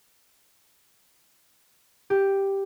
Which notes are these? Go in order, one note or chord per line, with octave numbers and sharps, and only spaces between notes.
G4